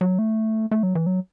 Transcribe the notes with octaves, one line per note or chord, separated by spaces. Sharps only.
F#3
A3
A3
F#3
E3
F#3